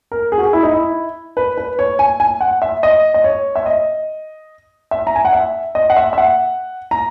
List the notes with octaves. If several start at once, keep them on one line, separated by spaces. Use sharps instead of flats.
A#4
G#4
F#4
G#4
E4
D#4
E4
B4
B4
C#5
G#5
G#5
F#5
E5
D#5
D#5
C#5
E5
D#5
E5
A#5
G#5
F#5
E5
D#5
F#5
E5
E5
F#5
A#5